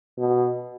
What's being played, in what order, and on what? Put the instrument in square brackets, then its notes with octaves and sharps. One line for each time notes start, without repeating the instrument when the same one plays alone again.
[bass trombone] B2